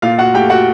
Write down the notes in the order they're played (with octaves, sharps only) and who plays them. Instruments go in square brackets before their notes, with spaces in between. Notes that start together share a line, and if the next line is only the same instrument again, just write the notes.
[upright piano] A#2 F4 F5
F#4 F#5
A3 G4 G5
F#4 F#5